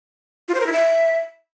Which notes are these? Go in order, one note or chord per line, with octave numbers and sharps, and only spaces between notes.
F4
C5
A#4
E4
E5